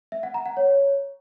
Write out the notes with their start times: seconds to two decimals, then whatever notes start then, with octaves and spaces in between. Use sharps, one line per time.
0.12 E5
0.23 F#5
0.34 A#5
0.46 F#5
0.57 C#5